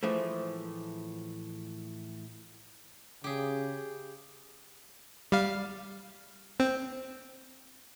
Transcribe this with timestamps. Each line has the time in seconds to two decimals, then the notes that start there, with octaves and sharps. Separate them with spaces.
0.03 A2 E3 F3 G#3 A3
3.24 C#3 G4 G#4
5.32 G3 F5
6.60 C4